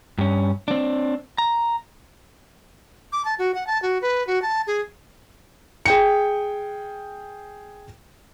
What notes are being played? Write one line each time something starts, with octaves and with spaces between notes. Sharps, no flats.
G2 C#4
C4 D4
A#5
D6
A5
F#4
F#5
A5
F#4
B4
F#4
A5
G#4
G#4 G5 C#7